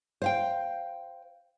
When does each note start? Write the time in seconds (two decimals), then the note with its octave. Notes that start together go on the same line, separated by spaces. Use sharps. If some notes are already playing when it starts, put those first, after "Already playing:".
0.22 C5 F5 G5